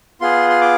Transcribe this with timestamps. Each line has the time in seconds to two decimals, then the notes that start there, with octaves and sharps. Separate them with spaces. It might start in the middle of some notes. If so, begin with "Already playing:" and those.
0.21 B3 F4 G#4 C6
0.50 C6
0.61 D6